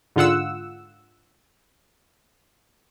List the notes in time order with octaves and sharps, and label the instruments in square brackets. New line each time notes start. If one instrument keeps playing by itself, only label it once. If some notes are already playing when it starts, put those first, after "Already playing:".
[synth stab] G#2 D3 F4 F#5 E6